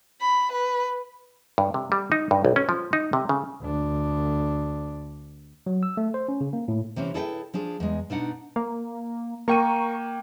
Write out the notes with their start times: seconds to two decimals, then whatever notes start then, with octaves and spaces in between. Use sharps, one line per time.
0.21 B5
0.52 B4
1.58 G2
1.74 C3
1.92 G3
2.12 D#4
2.31 G2
2.45 B1
2.56 C#4
2.69 F3
2.93 D#4
3.13 C3
3.29 C#3
3.62 D2 D4
5.66 F#3
5.83 E6
5.97 A3
6.14 C5
6.28 C#4
6.41 C#3
6.53 A#3
6.68 A2
6.96 C3 E3 C4 C#4
7.14 E4 G#4 A4 B4 D#5 G5
7.54 F3 D4 G#4
7.80 E2 G#3
8.10 B2 D4 D#4 F#5
8.56 A#3
9.48 A#3 A#4 G5 C#6 D#7